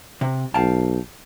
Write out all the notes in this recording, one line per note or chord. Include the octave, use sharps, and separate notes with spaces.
C3
B1 F5 G5 A5